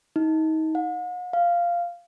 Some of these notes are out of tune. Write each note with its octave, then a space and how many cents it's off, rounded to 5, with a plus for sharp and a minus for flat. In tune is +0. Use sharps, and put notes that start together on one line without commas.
D#4 +30
F#5 -45
F5 -10